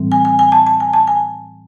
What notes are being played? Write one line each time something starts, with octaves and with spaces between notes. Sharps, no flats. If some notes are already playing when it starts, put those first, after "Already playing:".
Already playing: A2 E3 G3 C4
G#5
G#5
G#5
A5
A5
G#5
A5
G#5